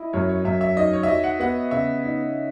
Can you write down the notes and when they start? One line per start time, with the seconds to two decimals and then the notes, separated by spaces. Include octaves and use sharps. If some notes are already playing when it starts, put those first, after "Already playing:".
Already playing: E4 D#5
0.13 F#2 C#5
0.29 C#5
0.45 F#2 E5
0.61 E5
0.77 D#4 D#5
0.93 C#5
1.03 E5
1.08 F#4 D#5
1.24 F#5
1.40 B3 F#5
1.71 C#3 E5
2.04 D#4